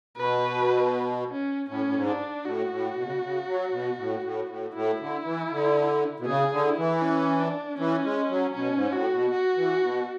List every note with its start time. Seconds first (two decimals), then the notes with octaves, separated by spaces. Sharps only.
0.17 B2 B4
1.31 C#4
1.69 A2 C#4
1.86 A2
1.94 G#2
2.07 D4
2.45 A2 F#4
2.71 A2
2.96 B2
3.04 C#3
3.12 B2
3.22 C#3
3.48 F#3
3.72 B2
3.97 A2
4.23 A2
4.49 A2
4.74 A2 E4
5.00 D3
5.24 E3
5.51 D3
6.20 B2
6.26 C#3 G#4
6.52 D3
6.64 E4
6.77 E3
7.02 C#4
7.41 D4
7.78 E3 C#4
8.04 G#3
8.29 F#3
8.55 B2 C#4
8.74 G#2
8.93 A2 F#4
9.13 B2
9.31 F#4
9.57 E3
9.82 B2